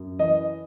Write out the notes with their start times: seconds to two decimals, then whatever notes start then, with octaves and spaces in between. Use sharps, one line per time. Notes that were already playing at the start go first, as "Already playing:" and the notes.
Already playing: F#2
0.19 E3 D#5